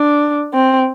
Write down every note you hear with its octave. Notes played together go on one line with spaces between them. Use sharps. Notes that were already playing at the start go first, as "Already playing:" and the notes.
Already playing: D4
C4